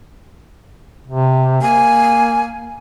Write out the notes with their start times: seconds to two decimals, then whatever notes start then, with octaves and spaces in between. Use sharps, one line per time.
1.07 C3
1.62 A#3 G#5